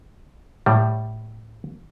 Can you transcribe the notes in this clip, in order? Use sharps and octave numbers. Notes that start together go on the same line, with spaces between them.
A2 G3